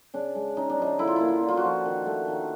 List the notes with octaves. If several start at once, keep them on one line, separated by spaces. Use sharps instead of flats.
C#3 D4
G#3
C#3 D#4
D4
F3 D#4
D3 E4
F4
A#3 E4
F4
D3
F4
F#4
F3
D#3
A3
D#3